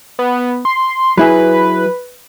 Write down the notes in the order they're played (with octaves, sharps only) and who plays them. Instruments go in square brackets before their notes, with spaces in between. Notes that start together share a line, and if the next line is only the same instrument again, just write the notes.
[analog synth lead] B3
C6
[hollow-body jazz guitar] F#3 E4 G#4 [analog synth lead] B4